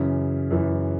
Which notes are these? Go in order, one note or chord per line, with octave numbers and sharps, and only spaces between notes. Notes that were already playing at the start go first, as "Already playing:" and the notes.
Already playing: F#2 C#3 E3
F#2 C#3 E3